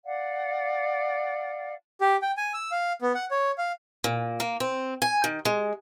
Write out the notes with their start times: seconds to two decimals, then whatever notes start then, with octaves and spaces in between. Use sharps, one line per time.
0.05 D5 F5 F#5
2.01 G4
2.22 G5
2.37 G#5
2.54 E6
2.71 F5
3.02 B3
3.15 F#5
3.31 C#5
3.58 F5
4.04 A#2
4.40 A#3
4.60 C4
5.02 G#5
5.24 D#3
5.45 G#3